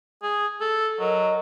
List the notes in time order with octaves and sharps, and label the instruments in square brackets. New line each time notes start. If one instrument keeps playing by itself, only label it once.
[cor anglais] G#4
A4
[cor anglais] F#3 [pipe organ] A#4 D#5